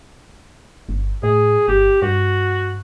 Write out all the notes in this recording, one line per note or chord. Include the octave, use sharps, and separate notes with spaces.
G1
A2 G#4
G1 G4
G2 F#4